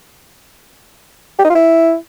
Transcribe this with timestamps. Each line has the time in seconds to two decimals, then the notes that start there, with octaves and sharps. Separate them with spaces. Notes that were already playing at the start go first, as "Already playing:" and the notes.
1.39 G4
1.45 D#4
1.50 F4
1.55 E4